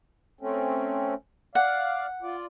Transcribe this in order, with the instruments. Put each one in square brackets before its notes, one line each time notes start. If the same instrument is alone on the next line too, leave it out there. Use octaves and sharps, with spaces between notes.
[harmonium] A3 C4 C#4
[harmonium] D5 F5 [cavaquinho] F#5
[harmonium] F4 D5